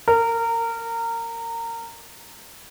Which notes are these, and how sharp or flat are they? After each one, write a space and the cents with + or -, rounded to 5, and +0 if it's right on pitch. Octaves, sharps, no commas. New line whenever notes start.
A#4 -25